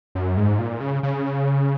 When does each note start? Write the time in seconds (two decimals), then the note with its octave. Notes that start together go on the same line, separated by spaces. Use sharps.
0.15 F#2
0.37 G#2
0.59 A#2
0.80 C#3
1.03 C#3